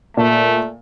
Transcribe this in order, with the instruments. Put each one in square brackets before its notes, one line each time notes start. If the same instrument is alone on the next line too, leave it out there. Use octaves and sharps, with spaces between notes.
[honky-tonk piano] A#2 [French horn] A3